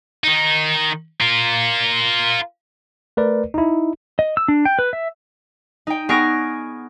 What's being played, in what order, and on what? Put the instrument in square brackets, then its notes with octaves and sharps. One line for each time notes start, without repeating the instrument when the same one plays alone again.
[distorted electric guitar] D#3 D#4
F4 A#4
[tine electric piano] A3 A#4 B4 D5
D#4 E4
[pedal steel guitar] D#5
E6
D4
G5
B4
E5
[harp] D#4 G5
B3 G#4 C#6 F6 A#6 D7